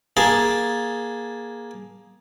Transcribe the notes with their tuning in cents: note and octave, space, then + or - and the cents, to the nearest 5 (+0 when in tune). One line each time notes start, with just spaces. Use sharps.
A#3 +15 G#4 +0 A5 +0